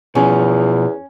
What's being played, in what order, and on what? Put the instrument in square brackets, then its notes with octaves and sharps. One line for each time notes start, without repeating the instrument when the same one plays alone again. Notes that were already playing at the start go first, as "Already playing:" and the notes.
[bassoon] E2 [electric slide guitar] B2 F3 [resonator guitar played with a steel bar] C#4